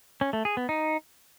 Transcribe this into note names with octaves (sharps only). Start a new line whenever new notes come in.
C#4
A3
G#4
B3
D#4